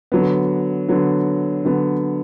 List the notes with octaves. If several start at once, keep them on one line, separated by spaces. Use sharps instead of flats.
D3 F#3 B3
D3 F#3 B3
D3 F#3 B3